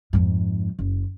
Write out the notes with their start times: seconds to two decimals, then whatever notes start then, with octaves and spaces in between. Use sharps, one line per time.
0.13 F2 G#2
0.79 F#1